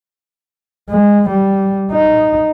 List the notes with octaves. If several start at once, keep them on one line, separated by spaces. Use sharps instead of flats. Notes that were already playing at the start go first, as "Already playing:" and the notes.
G#3
G3
D#4